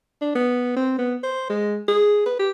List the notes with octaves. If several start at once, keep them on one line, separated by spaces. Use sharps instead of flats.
D4
B3
C4
B3
C5
G#3
G#4
B4
G4